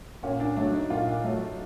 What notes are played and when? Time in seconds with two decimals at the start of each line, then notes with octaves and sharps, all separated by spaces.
0.23 A#2 C#4
0.40 D4
0.56 F#3 A3 D4
0.73 D#4
0.90 A#2 F4
1.24 F#3 A3